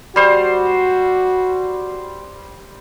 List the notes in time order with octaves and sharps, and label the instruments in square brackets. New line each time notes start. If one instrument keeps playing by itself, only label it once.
[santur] G3 C5 [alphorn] F#4